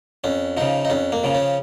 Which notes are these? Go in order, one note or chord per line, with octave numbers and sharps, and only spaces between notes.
F2 C#4
C#3 F3 D#4
D#4
F2 C#4
A#3
C#3 F3
C#4